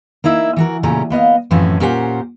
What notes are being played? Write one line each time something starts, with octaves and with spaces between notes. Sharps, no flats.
A#3 D#4 E4 E5
E3 F#4 A#4
A#2 C#3 A3 C#4 G4 A#5
A#3 B3 D#5 F5
F#2 A2 E3 F3 C4 C#4
A#2 C#4 G4 A#4 C5 F#5